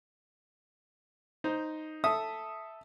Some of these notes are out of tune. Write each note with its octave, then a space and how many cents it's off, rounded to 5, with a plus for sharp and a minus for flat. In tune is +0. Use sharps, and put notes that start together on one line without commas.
D#4 +0 C5 +0
A4 +0 E5 +0 D#6 +0